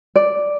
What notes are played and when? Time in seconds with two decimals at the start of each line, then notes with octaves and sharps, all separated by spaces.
0.16 D5